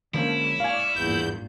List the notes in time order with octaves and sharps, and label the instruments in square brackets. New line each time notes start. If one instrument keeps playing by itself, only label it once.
[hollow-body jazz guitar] D3 F3 C#4 [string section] G#3 A#3 C#5 [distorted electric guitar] E4
[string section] D5 C#6 F6 [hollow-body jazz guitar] F5 G#5
[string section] G#1 G2 A#2 [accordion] E2 G6